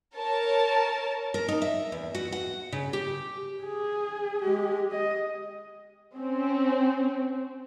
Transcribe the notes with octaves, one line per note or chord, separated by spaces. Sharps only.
A#4 C#5 A5
A#4
D#4
E5
E2
F#4
F#5
C#3
G4
G#4
G#3 G4
D#5
C4 C#4